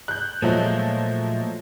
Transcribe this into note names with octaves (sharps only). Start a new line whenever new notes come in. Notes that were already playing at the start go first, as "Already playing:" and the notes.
F#6 G6
A#2 F3 F#3 G#3 A3